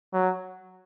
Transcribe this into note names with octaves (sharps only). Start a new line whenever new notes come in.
F#3